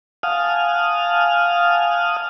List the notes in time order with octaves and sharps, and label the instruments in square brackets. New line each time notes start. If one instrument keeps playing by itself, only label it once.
[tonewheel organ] F5 F#5 G#5 A5 D#6 F6